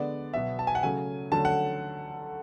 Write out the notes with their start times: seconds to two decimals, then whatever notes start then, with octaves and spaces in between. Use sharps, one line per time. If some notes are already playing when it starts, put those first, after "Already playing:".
Already playing: D3 G#3 B3 D4 D5
0.34 B2 F#3 B3 E5
0.59 A5
0.67 G#5
0.75 F#5
0.83 C#3 F#3 A3 G#5
1.32 D3 F#3 A3 C#4 A5
1.45 F#5